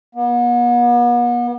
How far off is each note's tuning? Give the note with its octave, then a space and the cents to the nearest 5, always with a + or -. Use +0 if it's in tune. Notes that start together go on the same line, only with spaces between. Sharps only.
B3 -40